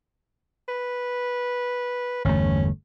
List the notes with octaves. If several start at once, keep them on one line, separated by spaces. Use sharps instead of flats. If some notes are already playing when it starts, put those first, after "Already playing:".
B4
G1 E2 A3 C#4